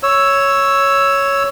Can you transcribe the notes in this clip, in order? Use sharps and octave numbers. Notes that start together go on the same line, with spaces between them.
C#5 E6